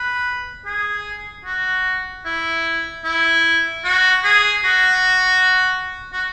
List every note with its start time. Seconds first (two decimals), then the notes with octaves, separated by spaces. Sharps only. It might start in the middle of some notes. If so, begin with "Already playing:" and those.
Already playing: B4
0.66 G#4
1.45 F#4
2.25 E4
3.05 E4
3.85 F#4
4.24 G#4
4.64 F#4
6.13 F#4